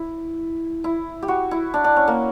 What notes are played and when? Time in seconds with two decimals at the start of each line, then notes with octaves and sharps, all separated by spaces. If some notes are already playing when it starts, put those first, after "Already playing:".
Already playing: E4
0.84 E4
1.22 G4
1.28 F#4
1.51 E4
1.74 D4
1.84 D4
1.96 C#4
2.08 A#3